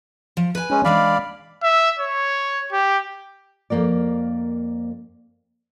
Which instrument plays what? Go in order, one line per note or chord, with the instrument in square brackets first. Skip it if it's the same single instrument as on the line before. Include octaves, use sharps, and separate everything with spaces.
[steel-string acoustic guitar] F3
B4 G#5
[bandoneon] G#3 C#4
[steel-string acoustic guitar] E3 G#3 D4 [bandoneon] D5 F5 B5
[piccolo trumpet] E5
C#5
G4
[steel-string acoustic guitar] F2 D#3 A#3 A#4 D5